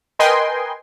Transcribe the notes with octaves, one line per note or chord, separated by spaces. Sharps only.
A#4 B4 D#5 G5 G#5 C6